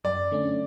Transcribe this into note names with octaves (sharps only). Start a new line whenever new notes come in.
F#2 D5
D3 A3 C#4